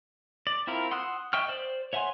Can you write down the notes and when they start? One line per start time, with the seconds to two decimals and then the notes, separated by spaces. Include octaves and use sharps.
0.47 D5
0.67 C4 E4 F4 A#4
0.91 F#5 C6 D#6 E6 F#6
1.33 D#5 E5 G5 C#6 F6
1.48 C5 D5
1.93 C#5 E5 F#5 G#5 C6